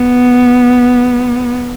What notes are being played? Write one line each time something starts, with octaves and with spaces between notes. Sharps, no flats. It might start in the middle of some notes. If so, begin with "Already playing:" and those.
Already playing: B3